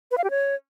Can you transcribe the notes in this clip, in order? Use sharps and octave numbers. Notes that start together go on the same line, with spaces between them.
B4
F5
G4
C#5